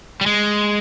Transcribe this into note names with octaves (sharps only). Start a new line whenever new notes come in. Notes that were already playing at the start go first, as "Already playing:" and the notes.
G3
G#3